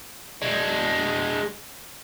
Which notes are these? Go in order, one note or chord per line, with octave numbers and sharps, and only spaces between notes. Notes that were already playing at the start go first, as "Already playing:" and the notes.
G#3 D4